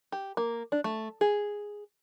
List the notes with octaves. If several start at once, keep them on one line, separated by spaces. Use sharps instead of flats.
G4
A#3
D4
A3
G#4